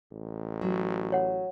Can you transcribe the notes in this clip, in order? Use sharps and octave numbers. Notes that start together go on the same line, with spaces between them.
A1
F#3
C#5 F#5